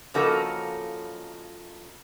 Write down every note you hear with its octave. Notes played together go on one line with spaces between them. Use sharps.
C#3 F3 A#3 D#4 F#4 A4